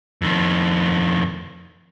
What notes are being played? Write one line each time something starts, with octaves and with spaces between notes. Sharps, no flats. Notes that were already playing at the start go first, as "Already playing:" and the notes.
F2 D#3